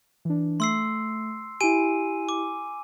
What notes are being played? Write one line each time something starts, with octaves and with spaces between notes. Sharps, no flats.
E3 D4
A3 C6 E6 C7
E4 G4 G#5 D#7
D6